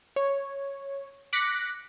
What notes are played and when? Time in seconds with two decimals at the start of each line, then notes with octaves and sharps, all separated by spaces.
0.16 C#5
1.33 D6 F#6 A#6 B6 C#7